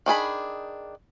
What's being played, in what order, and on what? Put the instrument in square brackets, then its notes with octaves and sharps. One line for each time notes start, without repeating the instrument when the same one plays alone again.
[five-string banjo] D#3 D4 G#4 B5